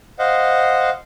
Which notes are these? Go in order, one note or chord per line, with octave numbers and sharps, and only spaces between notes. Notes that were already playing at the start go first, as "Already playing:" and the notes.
C5 D#5 F5 F#5